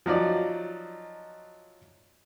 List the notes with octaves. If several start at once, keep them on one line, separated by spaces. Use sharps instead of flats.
F3 F#3 D#4 D5